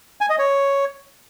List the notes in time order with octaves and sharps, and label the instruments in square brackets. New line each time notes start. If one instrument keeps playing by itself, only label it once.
[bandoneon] G#5
D#5
C#5